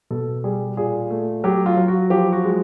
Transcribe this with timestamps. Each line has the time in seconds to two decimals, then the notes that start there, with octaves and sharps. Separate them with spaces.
0.11 B2 A4
0.44 G3 G#4
0.77 A#2 G#4
1.10 A3
1.44 F#3 G4
1.66 F4
1.77 F#3
1.88 F#4
2.10 F3 G4
2.33 F#4
2.44 G#3